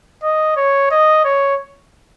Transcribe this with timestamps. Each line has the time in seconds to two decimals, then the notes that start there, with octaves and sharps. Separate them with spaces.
0.23 D#5
0.57 C#5
0.91 D#5
1.25 C#5